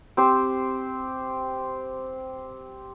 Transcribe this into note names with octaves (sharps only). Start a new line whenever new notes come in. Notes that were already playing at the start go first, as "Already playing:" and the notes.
C4 G4 C5